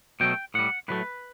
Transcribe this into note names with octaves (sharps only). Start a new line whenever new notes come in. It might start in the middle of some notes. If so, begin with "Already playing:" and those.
B2 F#3 A3 G5
A2 G3 F#5
A2 F#3 A3 B4